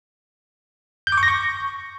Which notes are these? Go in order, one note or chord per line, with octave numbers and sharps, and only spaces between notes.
G6
D6
C#6
A#6
C#6